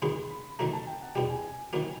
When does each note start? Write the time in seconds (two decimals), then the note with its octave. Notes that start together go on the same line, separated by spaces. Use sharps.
0.02 F#2 D#3 G#3 B3 C6
0.30 B5
0.59 D#3 F#3 A3 A#5
0.73 A5
0.87 G5
1.02 F#5
1.16 E2 B2 G3 G5
1.30 G#5
1.44 G#5
1.73 D#3 F#3 A#3